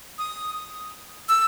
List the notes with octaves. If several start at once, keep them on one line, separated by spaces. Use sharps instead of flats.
D#6
E6